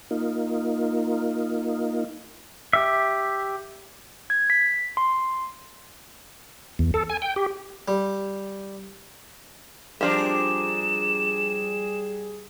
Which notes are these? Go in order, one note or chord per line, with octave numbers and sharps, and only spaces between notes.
A#3 D#4 F4
G4 E5
G#6
B6
C6
E2
A4
G#5
G5
G4
G3
F3 G3 C4 D4 G4 G#4 A#4 E7